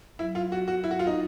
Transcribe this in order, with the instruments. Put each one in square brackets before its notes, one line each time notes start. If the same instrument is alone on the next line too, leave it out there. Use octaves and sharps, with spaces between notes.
[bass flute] F#3 [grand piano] E4
[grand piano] F4
F#4
F#4
E4
F#4
F4
D#4